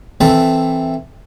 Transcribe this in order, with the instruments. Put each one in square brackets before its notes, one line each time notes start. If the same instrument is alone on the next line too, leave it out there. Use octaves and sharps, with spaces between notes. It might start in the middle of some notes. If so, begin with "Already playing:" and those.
[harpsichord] E3 C4 A4 E5